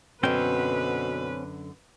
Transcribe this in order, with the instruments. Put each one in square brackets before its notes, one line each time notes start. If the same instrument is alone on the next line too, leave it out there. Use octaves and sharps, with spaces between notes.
[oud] F#2 D3 [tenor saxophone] B2 [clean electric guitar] C4 C#4 G5 [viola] B4